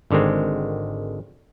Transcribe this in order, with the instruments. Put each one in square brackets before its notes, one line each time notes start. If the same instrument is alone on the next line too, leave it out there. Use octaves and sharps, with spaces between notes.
[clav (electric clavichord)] G#1 D3 D#3 G#3 C4